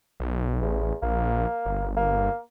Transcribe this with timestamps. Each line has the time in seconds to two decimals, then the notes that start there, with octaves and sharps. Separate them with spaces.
0.20 B1
0.62 A1 E2
1.03 A#1 A#3
1.66 G1
1.97 A#3